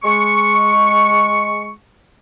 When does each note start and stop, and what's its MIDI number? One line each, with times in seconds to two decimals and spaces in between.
0.04 1.71 56
0.04 1.71 85